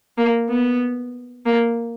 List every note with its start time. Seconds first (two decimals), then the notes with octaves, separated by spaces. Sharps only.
0.18 A#3
0.50 B3
1.46 A#3